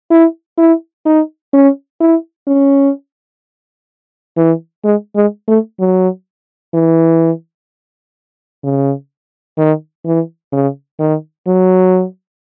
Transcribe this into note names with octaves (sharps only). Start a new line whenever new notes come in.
E4
E4
D#4
C#4
E4
C#4
E3
G#3
G#3
A3
F#3
E3
C#3
D#3
E3
C#3
D#3
F#3